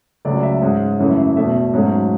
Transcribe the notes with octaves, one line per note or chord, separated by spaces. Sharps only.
C#2 C#3 F#3 A3 D5
E5
G#2 G#3 C#4
F#2 C#3 E3 A3 C#4
E2 B2 A3 E5
G#2 F#3 A3 C#4